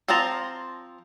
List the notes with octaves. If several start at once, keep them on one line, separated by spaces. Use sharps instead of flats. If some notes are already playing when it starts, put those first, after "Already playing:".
F3 C4 C5 A5 A#5